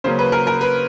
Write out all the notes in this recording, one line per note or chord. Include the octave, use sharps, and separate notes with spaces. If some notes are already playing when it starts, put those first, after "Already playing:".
C#3 F#3 A#3 C#4 C5
B4
A#4
A#4
B4